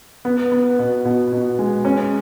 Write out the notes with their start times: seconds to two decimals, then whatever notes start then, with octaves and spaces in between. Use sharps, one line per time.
0.25 B3
0.52 B3
0.79 B2
1.05 B2
1.32 B2
1.59 G#3
1.85 C#4